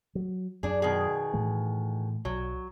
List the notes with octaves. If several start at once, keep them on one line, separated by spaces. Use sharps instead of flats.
F#3
F#2 D4 G#4
B2 D#3 G#4
A2 E3 A3
B1 F#3